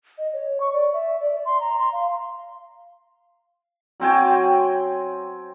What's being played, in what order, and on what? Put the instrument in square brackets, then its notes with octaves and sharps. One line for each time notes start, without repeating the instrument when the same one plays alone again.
[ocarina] D#5
C#5
C#6
D5
E5
D5
C6
A#5
C6
F5
[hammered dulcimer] F#3 C4 G5 G#5